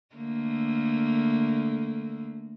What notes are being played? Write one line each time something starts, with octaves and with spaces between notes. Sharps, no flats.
D3 A3 A#3